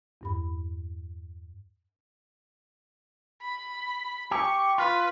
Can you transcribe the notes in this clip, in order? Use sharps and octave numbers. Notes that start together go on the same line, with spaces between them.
E2 G2 B5
B5
G4 C#6
F4 B4